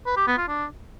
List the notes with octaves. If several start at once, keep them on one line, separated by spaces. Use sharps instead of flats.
B4
G4
B3
F4
D4